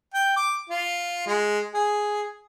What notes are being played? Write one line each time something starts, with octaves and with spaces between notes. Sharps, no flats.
G5
D6
F4
G#3
G#4